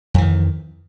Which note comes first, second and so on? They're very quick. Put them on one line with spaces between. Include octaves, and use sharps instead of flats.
F2 E3 D#3